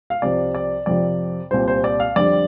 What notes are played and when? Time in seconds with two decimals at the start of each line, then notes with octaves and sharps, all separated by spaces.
0.10 F5
0.22 C2 C3 F3 D5
0.55 D5
0.86 F2 C3 F3 D5
1.51 C2 A#2 G3 C5
1.68 C5
1.84 D5
2.00 F5
2.16 F2 D3 G3 D5